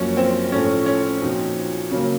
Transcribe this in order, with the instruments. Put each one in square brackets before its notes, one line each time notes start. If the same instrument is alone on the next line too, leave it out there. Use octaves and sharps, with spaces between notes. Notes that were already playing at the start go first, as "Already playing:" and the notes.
Already playing: [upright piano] F#2 F3 A#3 [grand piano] C#4
[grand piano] C4
[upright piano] A2 F3 A3 [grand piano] C#4
[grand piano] C#4
[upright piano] A#2 F3 C4 D#4 F#4
C#3 F#3 A#3